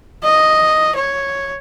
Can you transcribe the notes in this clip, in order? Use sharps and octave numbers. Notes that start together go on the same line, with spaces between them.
D#5
C#5